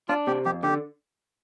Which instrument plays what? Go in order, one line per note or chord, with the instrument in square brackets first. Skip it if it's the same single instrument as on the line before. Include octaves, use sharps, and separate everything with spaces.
[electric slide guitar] D4 [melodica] F4
[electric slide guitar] C3 [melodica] G4
[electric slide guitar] F2 [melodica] G4
[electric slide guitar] D3 [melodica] G4